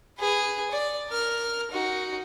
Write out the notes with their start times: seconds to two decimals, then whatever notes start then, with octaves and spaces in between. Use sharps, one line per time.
0.18 G#4 B4
0.71 D5
1.10 A#4 F6
1.71 D#4 F#4